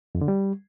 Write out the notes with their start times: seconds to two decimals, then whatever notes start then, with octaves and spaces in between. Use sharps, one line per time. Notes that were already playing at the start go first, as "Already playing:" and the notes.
0.15 F2
0.21 D3
0.28 G3